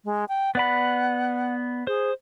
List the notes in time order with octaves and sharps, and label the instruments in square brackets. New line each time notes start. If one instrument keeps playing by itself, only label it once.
[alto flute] G#3
G5
[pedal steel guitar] B3 D5 B5 [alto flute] F#5
[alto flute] G#4 [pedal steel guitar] C5